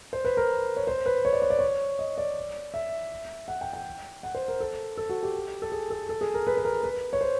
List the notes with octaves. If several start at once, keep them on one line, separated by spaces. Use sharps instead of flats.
C5
B4
A#4
C#5
C5
B4
C#5
D5
C#5
D5
C#5
D#5
D5
E5
F#5
G5
G5
F#5
C5
A#4
A4
A4
F#4
G4
A4
G#4
A4
A4
G#4
A#4
B4
B4
A#4
B4
C#5
C5